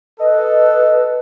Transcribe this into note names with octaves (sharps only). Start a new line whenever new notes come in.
A4 B4 D#5